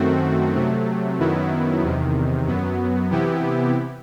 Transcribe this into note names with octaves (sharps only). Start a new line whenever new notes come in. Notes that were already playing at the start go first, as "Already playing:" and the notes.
Already playing: F#2 D#3 A3 C4 F#4
C3 F#3 A3
F#2 D#3 F#3 B3 E4
E2 C3 D#3
F#2 F#3 B3
C3 E3 B3 E4 G4